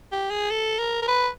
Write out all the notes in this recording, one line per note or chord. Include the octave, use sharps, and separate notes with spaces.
G4
G#4
A4
A#4
A#4
B4